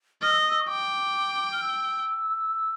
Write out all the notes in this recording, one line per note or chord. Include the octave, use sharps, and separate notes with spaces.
D#5 F6
E6
D#6
E6
C#6
G5 D6
F6
E6